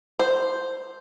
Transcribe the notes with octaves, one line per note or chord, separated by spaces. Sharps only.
C5